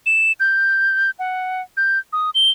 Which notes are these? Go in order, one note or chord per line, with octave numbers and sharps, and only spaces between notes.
E7
G6
F#5
G6
D#6
G7